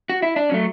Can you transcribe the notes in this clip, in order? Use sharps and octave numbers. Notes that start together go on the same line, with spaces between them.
F#4
E4
D4
F#3 A3 C#4